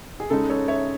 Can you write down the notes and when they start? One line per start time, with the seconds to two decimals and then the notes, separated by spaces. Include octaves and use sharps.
0.20 G#4
0.30 C#3 G#3 D#4 A4
0.50 A4 C#5
0.68 C#5 E5